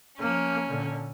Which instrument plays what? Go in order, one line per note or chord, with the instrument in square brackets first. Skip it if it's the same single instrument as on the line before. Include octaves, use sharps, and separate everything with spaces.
[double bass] F3 A#3 [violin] C#4
[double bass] A#2 D3